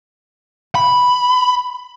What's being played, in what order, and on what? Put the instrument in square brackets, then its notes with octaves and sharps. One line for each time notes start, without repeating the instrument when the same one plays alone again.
[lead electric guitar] B5